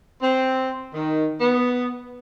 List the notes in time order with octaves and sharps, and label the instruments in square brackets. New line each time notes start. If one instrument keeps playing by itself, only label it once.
[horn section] C4
D#3
B3